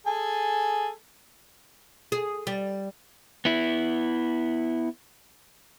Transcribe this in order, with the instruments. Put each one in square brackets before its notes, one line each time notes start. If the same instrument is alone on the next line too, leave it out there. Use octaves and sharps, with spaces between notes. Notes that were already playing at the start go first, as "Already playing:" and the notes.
[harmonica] G#4 A4 G#5
[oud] G#4
G3
[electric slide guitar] B3 E4